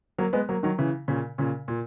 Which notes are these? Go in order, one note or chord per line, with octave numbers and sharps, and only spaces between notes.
F#3 A#3
G#3 B3
F#3 A#3
D#3 F#3
C#3 E3
A#2 C#3
A#2 C#3
A#2